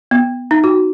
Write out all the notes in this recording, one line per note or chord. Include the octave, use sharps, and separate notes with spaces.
B3
D#4
F#4